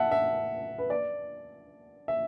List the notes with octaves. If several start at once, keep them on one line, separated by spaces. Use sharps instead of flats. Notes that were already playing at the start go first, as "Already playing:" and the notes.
Already playing: E5 F#5 A5
E5
B4
D5
E5